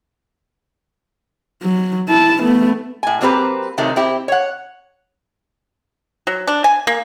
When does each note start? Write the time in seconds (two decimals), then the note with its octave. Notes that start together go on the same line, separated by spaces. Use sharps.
1.63 F#3
2.08 E4 A5
2.42 A3 B3
3.03 A2 G#5
3.21 F#3 A#3 C4 G4 B4
3.78 C3 D#3 F#3 A3
3.96 C4 E4 G4
4.28 C#5 F#5
6.27 F#3
6.47 D4
6.64 G#5
6.87 A#3